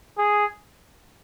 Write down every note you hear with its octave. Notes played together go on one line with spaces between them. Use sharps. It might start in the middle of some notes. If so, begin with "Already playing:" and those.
G#4